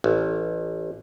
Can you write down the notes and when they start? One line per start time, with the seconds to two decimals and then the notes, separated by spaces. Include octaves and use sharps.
0.04 A1